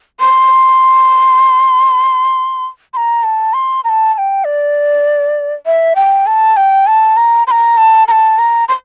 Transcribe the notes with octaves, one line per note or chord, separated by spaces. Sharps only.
C6
C6
A#5
A5
C6
A#5
A5
A5
G5
D5
E5
G5
A5
G5
A5
A#5
C6
A#5
A5
A#5
A5
A#5
C6